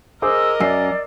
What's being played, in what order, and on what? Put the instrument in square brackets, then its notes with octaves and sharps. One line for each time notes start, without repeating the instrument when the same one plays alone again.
[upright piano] G#4 C5 D6 [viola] A#4 D#5 [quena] E6
[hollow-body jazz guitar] F#2 [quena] D5 [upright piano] E6 C7